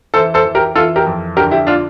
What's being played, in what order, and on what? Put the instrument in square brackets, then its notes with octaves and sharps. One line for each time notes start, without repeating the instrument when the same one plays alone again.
[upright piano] E3 A4 C5
A4 C5
E3
G4 A#4
E3 F4 A4
G4 A#4
F2
D3 G4 A#4
E4 G4
D4 F4